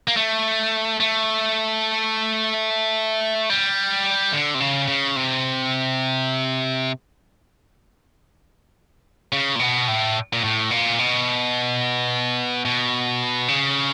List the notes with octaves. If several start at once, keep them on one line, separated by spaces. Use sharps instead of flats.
A#3
A3
A3
G3
D3
C3
C#3
C#3
C3
C#3
A#2
B2
A2
A#2
A2
A#2
B2
B2
C#3